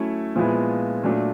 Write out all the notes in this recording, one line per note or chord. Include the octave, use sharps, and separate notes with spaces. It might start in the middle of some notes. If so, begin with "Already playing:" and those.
Already playing: F#3 A3 C#4 E4
A#2 F3 G#3 B3 E4
A#2 F#3 A3 D4